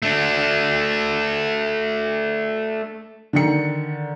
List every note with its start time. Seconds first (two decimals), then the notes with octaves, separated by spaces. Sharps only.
0.02 A3 D4
3.33 D3 D#3 C#7